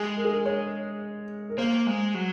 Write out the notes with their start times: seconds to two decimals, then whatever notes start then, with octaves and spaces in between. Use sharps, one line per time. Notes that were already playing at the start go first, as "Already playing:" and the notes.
Already playing: G#3 G#4
0.17 A#4
0.25 G#4
0.32 A#4
0.45 C#5
1.50 A#4
1.58 A#3 C5
1.87 G#3
2.15 F#3